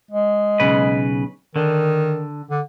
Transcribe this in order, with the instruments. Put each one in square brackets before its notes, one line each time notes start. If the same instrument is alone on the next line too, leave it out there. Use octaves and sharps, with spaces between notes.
[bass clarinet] G#3
[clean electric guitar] B1 C#3 B4
[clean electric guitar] D3 [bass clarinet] D#3
[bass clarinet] D3